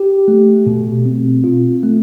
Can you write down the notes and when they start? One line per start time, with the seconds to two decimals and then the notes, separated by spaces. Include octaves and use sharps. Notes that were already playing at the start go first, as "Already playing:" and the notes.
Already playing: G4
0.28 A3
0.67 B2
1.06 C4
1.44 F4
1.83 A3